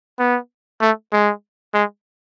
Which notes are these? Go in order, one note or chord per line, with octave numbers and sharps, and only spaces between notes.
B3
A3
G#3
G#3